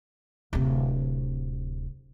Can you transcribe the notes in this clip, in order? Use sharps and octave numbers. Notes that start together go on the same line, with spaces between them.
D1 C3